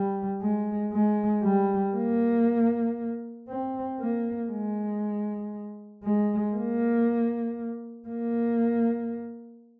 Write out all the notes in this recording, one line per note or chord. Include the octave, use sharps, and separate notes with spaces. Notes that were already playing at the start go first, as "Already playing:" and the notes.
Already playing: G3
G#3
G#3
G3
A#3
C4
A#3
G#3
G#3
A#3
A#3